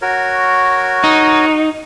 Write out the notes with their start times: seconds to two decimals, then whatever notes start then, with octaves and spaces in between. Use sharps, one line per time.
0.02 F#4 A#4 C#5
1.04 D#4